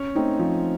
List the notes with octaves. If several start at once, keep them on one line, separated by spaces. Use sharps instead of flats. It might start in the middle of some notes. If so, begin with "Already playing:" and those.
Already playing: C#4 C#5
A3 C4 D#4
F3